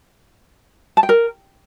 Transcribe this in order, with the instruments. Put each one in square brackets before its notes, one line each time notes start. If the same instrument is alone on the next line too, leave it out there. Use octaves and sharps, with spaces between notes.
[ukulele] A5
G5
A#4